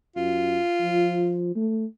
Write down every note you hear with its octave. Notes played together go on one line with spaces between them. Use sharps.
F#2 F4
F3
A3